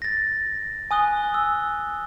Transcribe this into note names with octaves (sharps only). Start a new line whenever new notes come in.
A6 A#6
G#5 D#6 F#6 G7
E6